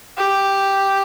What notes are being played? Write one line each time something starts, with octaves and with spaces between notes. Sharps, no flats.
G4